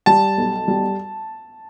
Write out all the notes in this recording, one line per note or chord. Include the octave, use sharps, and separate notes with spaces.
G3 A5
B1
G3